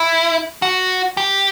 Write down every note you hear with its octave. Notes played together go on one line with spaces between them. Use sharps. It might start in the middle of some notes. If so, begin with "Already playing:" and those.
Already playing: E4
F#4
G4